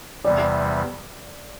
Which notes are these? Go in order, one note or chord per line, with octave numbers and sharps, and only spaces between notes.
E2 C3 E3 G3 D5